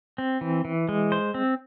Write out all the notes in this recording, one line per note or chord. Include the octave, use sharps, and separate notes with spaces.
C4
E3
E3
G#3
C5
C4